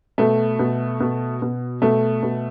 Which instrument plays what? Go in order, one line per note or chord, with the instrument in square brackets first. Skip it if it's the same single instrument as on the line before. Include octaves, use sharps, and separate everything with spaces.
[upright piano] B2 A3
B2
B2
B2
B2 A3
B2